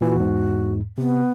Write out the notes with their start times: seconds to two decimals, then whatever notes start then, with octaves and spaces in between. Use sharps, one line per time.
0.01 A#2 E3 F#4
0.16 E2 G#2
0.98 C3 B3